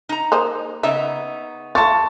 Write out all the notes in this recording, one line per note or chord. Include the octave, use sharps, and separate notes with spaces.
D#4 A#5
A#3 C5 D#5
C#3 B3 D#4 E5
A3 F4 A5 C#6 A6